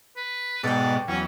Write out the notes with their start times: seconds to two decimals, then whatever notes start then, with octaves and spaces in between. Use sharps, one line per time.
0.16 B4
0.63 G#2 B2 A4 C#5 D5 G5
1.08 E2 F#3 C#4